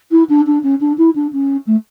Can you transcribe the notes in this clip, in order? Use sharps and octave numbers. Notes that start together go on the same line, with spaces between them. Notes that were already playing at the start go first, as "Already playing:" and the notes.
E4
D4
D4
C#4
D4
E4
D4
C#4
A3